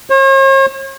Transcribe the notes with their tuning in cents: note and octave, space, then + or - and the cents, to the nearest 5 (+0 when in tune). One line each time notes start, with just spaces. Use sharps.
C#5 -45